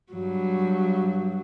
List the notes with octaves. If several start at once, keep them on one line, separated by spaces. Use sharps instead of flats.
G2 F#3